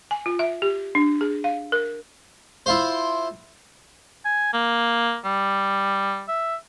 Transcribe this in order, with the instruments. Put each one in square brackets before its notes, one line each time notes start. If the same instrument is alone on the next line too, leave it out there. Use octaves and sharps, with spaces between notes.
[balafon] G#5
F4
E5
G4
D4
G#4
F5
A#4
[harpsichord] E4 F4 C5
[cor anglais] G#5
A#3
G3
E5